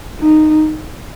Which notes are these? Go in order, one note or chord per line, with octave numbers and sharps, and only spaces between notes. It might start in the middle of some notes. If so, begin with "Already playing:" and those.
D#4